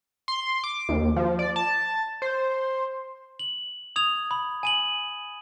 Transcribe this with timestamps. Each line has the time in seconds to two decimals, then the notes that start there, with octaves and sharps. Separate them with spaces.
0.28 C6
0.64 D6
0.89 D#2
1.16 F3
1.39 D5
1.56 A5
2.22 C5
3.39 F#7
3.96 D#6 G#6 F7
4.31 B5
4.63 G#5 D#7 F#7